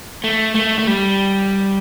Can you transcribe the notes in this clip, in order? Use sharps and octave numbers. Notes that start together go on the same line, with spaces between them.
A3
A3
A3
G3